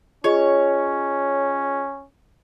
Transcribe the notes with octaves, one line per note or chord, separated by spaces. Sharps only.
C#4 F4 G#4 C#5 D#5